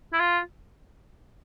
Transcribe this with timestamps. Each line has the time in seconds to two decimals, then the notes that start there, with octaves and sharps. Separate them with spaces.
0.13 E4
0.20 F4